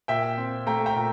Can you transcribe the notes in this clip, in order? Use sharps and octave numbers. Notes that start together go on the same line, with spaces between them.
A#2 E5 G5
C4
A3 G5 A#5
G5 A#5
A#2